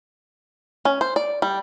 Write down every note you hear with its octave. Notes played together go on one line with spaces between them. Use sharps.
C#4
C5
D5
G3